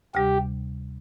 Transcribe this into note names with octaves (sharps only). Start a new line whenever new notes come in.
D2 C3 G3 G4